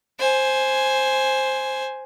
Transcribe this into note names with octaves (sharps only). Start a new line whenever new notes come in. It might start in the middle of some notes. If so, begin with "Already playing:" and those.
C5 G#5